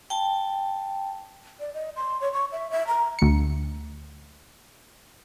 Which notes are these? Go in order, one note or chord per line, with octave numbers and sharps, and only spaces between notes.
G5 A5
D5
D#5
C6
C#5
C#6
E5
E5
A#5
D2 C#7